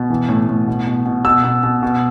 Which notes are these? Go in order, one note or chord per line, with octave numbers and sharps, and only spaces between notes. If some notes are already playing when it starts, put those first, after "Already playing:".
Already playing: B2
E3
A2
A2
B2
B2
B2
B2 E6
B2
B2
B2